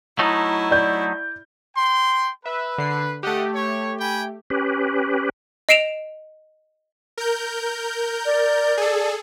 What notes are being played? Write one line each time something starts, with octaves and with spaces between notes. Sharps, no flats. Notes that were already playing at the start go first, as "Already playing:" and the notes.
F#3 A3 D#4 E4
D5 G6
G5 C6
B4 E5
D3 C7
A3 G4 D#5 F#5
C#5
G5 G#5 B5
C#4 G4 B4
D#5 C7 D7 E7 F7
A#4 G6
D5
G#4 A4